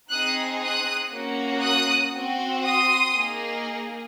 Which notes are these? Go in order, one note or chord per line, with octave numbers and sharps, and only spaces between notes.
C4 D#4 G#4 D#6 F#6
D#6 F#6
A#3 C#4 F#4
D#6 F#6
C4 F#4
C6 D#6
A#3 D#4 G#4